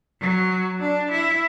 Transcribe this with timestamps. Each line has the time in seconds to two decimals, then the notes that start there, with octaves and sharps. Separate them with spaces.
0.21 F#3
0.81 D4
1.11 E4